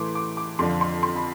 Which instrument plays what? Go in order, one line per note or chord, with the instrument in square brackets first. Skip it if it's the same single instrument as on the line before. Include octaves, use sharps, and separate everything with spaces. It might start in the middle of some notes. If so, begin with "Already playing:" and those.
Already playing: [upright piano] A2 E3 A3 C6 D6
D6
D6
F2 D3 F3 C6
C6
C6
B5